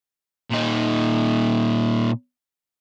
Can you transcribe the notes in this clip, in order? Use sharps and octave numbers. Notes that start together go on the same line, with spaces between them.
A#2 D#4